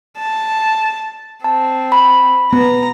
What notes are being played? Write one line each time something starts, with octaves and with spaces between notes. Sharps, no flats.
A5
C4 A5
B5
B3 A#5